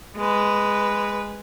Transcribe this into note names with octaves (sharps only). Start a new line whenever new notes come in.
G#3 B4